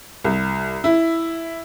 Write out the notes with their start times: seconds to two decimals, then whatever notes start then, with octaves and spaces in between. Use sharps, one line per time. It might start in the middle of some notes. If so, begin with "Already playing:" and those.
0.25 C2
0.84 E4